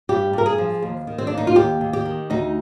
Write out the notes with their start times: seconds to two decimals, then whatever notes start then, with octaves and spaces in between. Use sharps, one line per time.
0.09 G2 G4
0.33 G2 A#4
0.46 G#4
0.58 F3
0.82 D#2
1.07 D#3
1.18 C4
1.27 D4
1.32 A#3
1.38 D#4
1.47 F4
1.56 D#2 G4
1.81 D#2
1.93 G4
2.05 D#3
2.30 D2 D#4